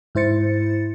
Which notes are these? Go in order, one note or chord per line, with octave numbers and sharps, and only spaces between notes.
G#2 E4 C5 A6 C#7